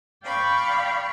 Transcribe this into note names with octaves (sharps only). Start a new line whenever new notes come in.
D5 F5 G5 B5 C#6